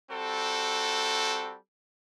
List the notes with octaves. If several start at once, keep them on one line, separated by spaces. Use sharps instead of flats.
G3 C4 F#4 A4